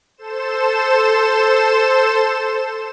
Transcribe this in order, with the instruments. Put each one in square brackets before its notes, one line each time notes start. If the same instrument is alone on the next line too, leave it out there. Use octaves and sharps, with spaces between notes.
[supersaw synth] A4 C5 E7